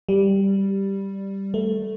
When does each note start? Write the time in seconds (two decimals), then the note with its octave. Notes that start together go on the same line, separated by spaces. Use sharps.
0.09 G3
1.54 A3